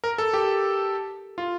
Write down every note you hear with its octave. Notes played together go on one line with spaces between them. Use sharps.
A#4
A4
G4
F4